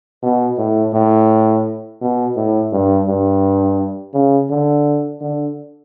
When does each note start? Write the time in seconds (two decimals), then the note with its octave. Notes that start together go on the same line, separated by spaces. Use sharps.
0.23 B2
0.58 A2
0.94 A2
2.01 B2
2.36 A2
2.72 G2
3.08 G2
4.14 C#3
4.50 D3
5.21 D3